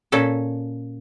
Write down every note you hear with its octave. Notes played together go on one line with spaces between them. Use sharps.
A#2 C#4 A4